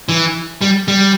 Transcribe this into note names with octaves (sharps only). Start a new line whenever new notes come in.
E3
G3
G3